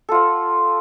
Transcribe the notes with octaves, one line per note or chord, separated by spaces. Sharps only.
F4 A4 F#5